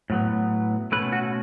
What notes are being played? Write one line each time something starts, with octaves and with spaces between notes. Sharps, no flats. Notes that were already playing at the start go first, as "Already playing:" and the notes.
A2 F#3 B3
B2 A3 C#4 B4
F#4